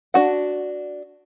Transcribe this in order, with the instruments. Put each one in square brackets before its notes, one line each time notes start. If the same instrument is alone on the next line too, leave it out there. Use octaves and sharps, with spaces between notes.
[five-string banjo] D4 F#4 F#5